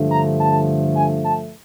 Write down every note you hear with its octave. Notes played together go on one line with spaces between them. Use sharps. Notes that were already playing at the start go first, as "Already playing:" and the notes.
Already playing: G2 D3 F3 A3
A#5
A5
G#5
A5